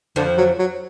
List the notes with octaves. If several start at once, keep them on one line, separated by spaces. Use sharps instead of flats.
F2 D3 F3
F#3
F#3